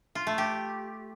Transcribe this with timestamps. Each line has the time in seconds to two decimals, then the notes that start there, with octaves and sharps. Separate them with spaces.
0.15 F4
0.27 A3
0.38 G4